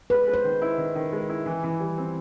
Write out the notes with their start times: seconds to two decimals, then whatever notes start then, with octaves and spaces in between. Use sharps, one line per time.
0.10 G#3 B4
0.27 G#3
0.34 C5
0.44 D#3
0.62 E4
0.78 D#3
0.95 D#3
1.12 G#3
1.29 E4
1.46 E3
1.64 E3
1.80 G3
1.98 C4